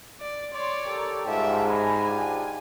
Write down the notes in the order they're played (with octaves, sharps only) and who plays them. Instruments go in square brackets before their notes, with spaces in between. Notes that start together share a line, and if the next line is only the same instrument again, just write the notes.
[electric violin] D5
[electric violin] C#5 D5 [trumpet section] C6
[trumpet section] G4 A4 A#4
[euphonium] G#2 [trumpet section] G3 F4 A5 [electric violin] G4 E5
[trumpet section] G#4 A#5 B5 [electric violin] G#5
[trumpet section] D4 F4 G4